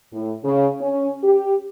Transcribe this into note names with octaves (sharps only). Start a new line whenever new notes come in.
A2
C#3
C#4
G4